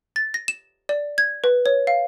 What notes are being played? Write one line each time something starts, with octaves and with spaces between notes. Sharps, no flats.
A6
A#6
E7
D5
G#6
B4
C#5
F5